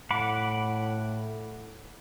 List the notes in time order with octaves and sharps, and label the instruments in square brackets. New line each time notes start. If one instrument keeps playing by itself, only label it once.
[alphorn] A2 [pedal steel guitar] F#5 B5 D6